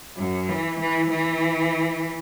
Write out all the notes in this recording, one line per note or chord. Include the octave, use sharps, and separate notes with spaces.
F#2
E3
E3
E3